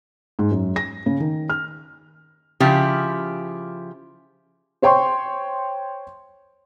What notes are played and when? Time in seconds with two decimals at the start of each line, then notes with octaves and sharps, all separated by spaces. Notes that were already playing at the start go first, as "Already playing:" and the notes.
0.39 G#2
0.51 F#2
0.76 A#6
1.06 C#3
1.20 D#3
1.50 F6
2.60 C#3 F3 E4 G4
4.82 C5 C#5 G5 C6 C#6